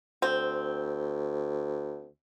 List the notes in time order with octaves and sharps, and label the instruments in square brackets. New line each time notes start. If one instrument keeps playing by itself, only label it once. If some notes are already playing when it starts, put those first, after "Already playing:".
[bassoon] D2 [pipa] C4